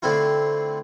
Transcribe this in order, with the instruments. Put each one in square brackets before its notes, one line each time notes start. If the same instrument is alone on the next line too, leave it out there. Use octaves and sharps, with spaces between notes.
[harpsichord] D3 A3 C4 E4 F4